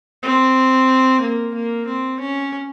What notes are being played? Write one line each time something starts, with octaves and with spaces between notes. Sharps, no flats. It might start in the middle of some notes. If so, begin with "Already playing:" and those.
C4
A#3
A#3
C4
C#4